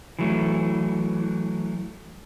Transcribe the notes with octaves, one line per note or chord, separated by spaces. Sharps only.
E3 F#3 A3